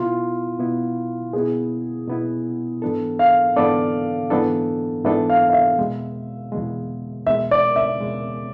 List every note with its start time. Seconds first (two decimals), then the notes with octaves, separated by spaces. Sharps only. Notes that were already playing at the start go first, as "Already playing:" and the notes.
Already playing: B2 B3 E4 F4
0.59 B2 B3 E4
1.33 B2 B3 E4 G#4
2.07 B2 B3 E4
2.82 G#2 E3 B3 D4 A4
3.19 F5
3.56 G#2 E3 B3 D4 A4 D5
4.30 G#2 E3 B3 D4 A4
5.04 G#2 E3 B3 D4 A4 E5
5.30 F5
5.49 F5
5.53 E5
5.79 E2 B2 G#3
6.52 E2 B2 G#3
7.26 E2 B2 G#3 E5
7.51 D5
7.76 E5
8.00 E2 B2 G#3